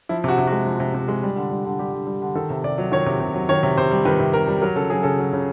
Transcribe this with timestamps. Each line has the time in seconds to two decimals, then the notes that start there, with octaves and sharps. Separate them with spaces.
0.09 F3 E4
0.24 C3 F#4
0.38 C3
0.47 G#3 F#4
0.66 F3
0.80 C3
0.94 C3
1.08 G#3
1.23 G3
1.36 D3
1.51 G3
1.65 D3
1.79 G3 G4
1.93 D3
2.07 G3
2.22 D3
2.35 D#3 A4
2.50 C3
2.64 C3 D5
2.78 F#3
2.92 D#3 C#5
3.06 C3
3.20 C3
3.34 F#3
3.49 D#3 C#5
3.63 C3
3.78 C3 C5
3.91 G3
4.05 D#3 B4
4.20 C3
4.33 C3 A#4
4.48 G3
4.62 F#3 A#4
4.76 C#3 A4
4.90 F#3 G#4
5.03 C#3 A4
5.19 F#3
5.33 C#3